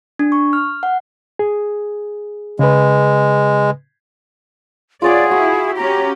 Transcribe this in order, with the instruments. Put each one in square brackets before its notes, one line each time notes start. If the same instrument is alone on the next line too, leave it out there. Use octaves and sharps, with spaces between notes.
[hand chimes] D4
C#6
F6
F#5
[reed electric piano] G#4
[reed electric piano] C#3 B4 [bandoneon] G#3
[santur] F4 C#5 F#5 [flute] G#4 [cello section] D5
[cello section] E4 [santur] F#4
[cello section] C#4 G4 [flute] A#5